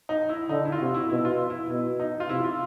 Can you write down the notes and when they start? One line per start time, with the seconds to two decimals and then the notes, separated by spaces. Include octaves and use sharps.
0.09 D#4
0.29 E4
0.49 D3 D#4
0.65 E4
0.72 F4
0.80 C3 F#4
0.94 E4
1.10 B2 E4
1.25 F4
1.29 E4
1.50 E4
1.69 B2 E4
2.00 D#4
2.20 F4
2.29 C3 E4
2.44 F4